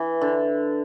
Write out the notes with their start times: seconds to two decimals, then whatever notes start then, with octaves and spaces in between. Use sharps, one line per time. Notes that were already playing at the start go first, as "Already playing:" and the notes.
Already playing: E3
0.21 D3